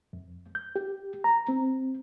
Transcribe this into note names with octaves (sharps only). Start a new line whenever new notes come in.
F2
G6
G4
A#5
C4